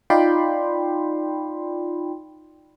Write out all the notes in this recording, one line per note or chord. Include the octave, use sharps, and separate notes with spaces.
D#4 F4 D5 G5 B5 C6